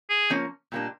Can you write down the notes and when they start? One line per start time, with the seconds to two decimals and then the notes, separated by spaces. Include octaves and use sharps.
0.10 G#4
0.30 F3 A#3 C#4
0.72 A#2 G3 A#3 D4